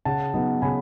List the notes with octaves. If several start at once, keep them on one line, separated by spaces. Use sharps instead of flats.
C#3 F#5 A5
F#3 B3 D#4
C#3 G#5 B5